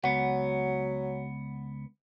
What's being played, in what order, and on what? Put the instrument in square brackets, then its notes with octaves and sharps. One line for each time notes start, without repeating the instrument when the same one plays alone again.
[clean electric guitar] C#2 B3 [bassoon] F#3 [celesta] F#5